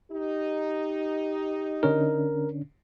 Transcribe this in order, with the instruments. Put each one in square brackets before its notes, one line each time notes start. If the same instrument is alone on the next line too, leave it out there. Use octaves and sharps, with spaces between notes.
[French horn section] D#4 [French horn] G4
[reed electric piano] D3 C#4 D4 [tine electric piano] A#4